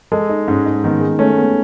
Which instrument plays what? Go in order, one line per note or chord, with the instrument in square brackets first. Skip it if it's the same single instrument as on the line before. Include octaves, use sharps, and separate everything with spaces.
[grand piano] G#3 [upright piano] A4
[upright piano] D#4
[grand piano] G#2 [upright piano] C#4
[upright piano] D#4
[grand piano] D#3 [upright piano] B3
[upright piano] G#3
[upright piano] A3 [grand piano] C#4
[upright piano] B3